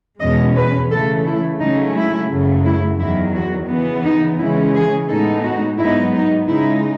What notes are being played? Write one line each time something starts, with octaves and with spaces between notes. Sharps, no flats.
E2 B2 G#3 C#4 D#5
B4
C#3 E3 A3 A4
E4
C#3 F#3 A3 C#4 D#4
E4
F#2 C#3 F#3 A3
E4
E2 D#3 F#3 E4
F#4
C#3 E3 B3
D#4
C#3 E3 G#3 C#4 E4
G#4
A2 G#3 B3 D#4 A4
F#4
G#2 F#3 B3 D#4 E4
D#4
C#3 G#3 D#4 E4